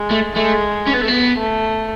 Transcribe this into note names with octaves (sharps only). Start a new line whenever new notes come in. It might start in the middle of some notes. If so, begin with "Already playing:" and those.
Already playing: G#3
A3
G#3 A3
C#4
B3
A3
B3
A3